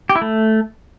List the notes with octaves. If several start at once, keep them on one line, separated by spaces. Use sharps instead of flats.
G4
E4
A3